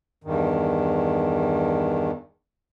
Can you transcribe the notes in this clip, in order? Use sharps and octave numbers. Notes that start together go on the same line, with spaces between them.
E2 G2 D#3